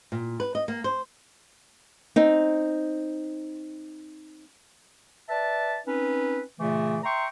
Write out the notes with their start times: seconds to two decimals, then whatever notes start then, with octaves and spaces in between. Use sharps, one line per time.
0.12 A#2
0.40 B4
0.55 D#5
0.68 A#3
0.84 C5
2.16 C4 D#4
5.29 B4 D5 E5 A5
5.86 C4 C#4 D#4 B4
6.59 A#2 C#3 E3 A3
7.03 E5 G5 A#5 C6 C#6